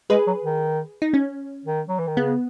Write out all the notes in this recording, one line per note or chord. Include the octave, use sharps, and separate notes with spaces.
G#3 G#4 B4
F#3
D#3
D#4
C#4
D#3
F#3
E3
D#3
C#3 B3